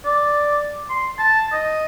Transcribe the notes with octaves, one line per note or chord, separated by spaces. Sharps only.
D5
C6
A5
D#5